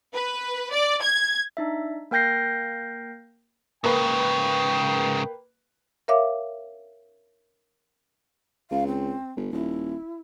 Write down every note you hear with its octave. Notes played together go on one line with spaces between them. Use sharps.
B4
D5
G#6
D4 D#4 E5
A#3 A#4 G5 G6 A#6 C7
G#2 C#3 A#3 B4 G5
A#4 C#5 E5 F5 D6
C#2 F5
C4
G1
D#1 E4